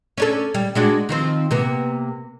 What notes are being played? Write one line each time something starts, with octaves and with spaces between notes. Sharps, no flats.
C#4 D4 A4
G3
G#3 D4 F#4
D#3 F3 C4
C3 A#3 B3